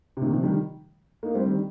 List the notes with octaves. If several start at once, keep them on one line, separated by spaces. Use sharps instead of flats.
C3
A#2 D#3
C3 F3
D#3 G3
A#3 D#4
G3 C4
D#3 G3